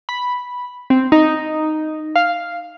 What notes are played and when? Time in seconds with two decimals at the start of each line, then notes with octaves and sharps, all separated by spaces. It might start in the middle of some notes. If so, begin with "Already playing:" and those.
0.09 B5
0.90 C4
1.12 D#4
2.16 F5